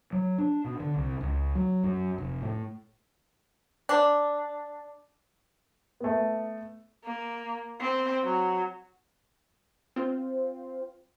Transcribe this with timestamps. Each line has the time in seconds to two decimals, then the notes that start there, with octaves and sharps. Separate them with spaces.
0.13 F#3
0.38 D4
0.64 B2
0.80 D3
0.96 C2
1.21 C#2
1.55 F#3
1.84 F#2
2.18 F1
2.42 A2
3.89 D4
6.00 A3 B3
7.04 A#3
7.80 C4
8.24 F#3
9.96 C4 F4